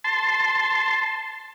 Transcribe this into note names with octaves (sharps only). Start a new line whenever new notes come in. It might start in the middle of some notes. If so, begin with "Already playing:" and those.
A5 C6